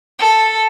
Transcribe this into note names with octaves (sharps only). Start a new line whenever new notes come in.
A4